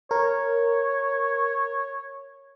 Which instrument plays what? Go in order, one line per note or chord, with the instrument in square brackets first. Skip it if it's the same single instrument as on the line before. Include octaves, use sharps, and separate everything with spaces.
[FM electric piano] A#4 [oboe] C#5